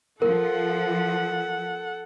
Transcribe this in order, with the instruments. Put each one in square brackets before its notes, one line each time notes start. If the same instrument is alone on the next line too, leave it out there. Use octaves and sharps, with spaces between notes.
[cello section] F3 [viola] A4 F#5 [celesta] A#4